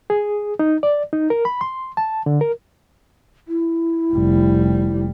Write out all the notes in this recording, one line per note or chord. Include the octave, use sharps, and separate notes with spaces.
G#4
D#4
D5
D#4
A#4
B5
C6
A5
D3
A#4
E4
F1 G3